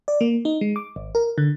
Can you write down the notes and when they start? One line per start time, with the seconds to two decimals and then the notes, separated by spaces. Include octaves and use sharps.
0.08 D5
0.21 A#3
0.45 D#4
0.61 G#3
0.76 D6
0.96 G#1
1.15 A#4
1.38 D3